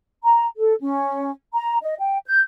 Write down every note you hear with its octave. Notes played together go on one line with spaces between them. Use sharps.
A#5
A4
C#4
A#5
D#5
G5
G6